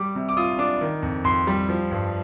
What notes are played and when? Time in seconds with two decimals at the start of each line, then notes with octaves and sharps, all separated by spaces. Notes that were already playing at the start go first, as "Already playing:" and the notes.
Already playing: G3 D6
0.15 C3
0.29 D6
0.37 F4 D#6
0.59 D4 D6
0.81 D#3
1.03 F2
1.24 F2 C6
1.47 G3
1.69 F3
1.91 G2